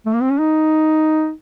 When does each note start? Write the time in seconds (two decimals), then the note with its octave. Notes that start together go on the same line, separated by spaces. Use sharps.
0.06 A3
0.14 A#3
0.22 C4
0.30 C#4
0.39 D#4